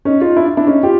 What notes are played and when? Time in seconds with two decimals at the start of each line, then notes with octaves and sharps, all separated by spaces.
0.05 C#4 D#4
0.21 D#4 F4
0.37 D4 E4
0.57 D4 E4
0.67 C#4 D#4
0.83 F4 G4